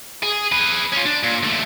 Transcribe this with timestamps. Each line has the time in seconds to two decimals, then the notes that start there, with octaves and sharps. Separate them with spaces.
0.23 G#4
0.52 G#4 B4
0.93 C#4 F4
1.05 D4
1.23 A#2
1.43 D#2 A3